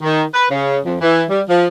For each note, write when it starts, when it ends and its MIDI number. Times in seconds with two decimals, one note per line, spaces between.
0.01 0.23 51
0.34 0.45 71
0.51 0.78 49
0.85 0.95 41
1.00 1.23 52
1.29 1.42 55
1.49 1.66 53